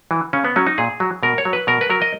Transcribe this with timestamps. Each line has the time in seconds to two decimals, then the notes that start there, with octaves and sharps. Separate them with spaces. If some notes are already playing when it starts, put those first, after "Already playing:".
0.11 E3
0.33 C#3 C#4
0.45 B3
0.56 F#3 C#4
0.67 D#4
0.78 A#2 G#4
1.00 F#3
1.23 B2 A#4
1.38 C#5
1.45 F#3
1.53 B4
1.67 B2 A#4
1.81 B4
1.90 F#3 A#4
2.02 D#5